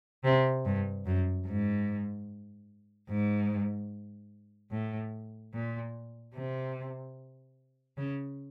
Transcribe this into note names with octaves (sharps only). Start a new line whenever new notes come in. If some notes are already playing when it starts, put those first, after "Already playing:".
C3
G2
F#2
G#2
G#2
A2
A#2
C3
C#3